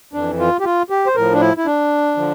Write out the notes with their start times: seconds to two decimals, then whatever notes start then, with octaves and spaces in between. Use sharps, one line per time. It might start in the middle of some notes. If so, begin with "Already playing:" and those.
0.13 F2 E3 D4
0.39 F4
0.60 G4
0.65 F4
0.90 G4
1.06 C5
1.15 A2 F3 A#4
1.33 D4
1.41 E4
1.57 E4
1.66 D4
2.17 D3 F3